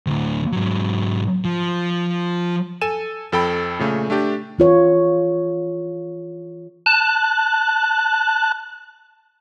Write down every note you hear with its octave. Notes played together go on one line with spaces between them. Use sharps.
D2 A2
G#2 F#3
F3
A4 G#5 D#7 E7
F2 A4 G5 B5
A#2 C#3 A3
A3 D4 G4
E3 F4 C#5
A5 F#6